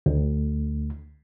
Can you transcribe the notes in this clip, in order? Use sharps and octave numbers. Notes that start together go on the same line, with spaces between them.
D2